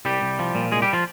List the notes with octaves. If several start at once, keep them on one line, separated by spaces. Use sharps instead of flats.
C2 G3 G4
C2
F3
A#2
C2 G#3 G#4
G3 G4
F3 F4